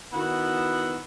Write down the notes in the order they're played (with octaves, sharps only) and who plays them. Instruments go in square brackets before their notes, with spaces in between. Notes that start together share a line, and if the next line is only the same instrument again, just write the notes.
[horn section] D#3 B3 E4 F#4 F#5